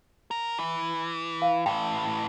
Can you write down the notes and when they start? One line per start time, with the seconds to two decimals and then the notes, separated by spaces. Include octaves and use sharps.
0.31 A#4
0.58 E3
1.42 F5
1.66 A2 E3 G5